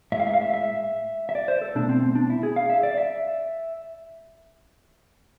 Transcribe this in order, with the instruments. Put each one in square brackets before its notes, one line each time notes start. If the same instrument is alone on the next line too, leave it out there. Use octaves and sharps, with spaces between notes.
[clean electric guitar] A2 E5
G#3 F5
E5
F5
E5
E5
E5
D5
C5
A4
B2 A3 D4
C4
C4
D4
E4
G#4
F5
E5
D5
E5